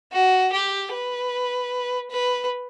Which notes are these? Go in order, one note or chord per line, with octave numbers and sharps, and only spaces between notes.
F#4
G4
B4
B4